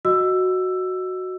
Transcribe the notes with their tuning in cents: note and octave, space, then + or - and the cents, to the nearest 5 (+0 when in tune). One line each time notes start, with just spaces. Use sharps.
F#4 +0 D#5 +0 E6 +10